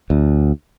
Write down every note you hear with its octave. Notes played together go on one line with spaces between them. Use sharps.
D2